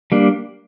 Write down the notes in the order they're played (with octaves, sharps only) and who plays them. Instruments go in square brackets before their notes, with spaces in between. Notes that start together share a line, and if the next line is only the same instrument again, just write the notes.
[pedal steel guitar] G3 A#3 D4